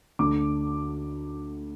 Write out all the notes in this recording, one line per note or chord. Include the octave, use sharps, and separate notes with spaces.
D2 D3 D6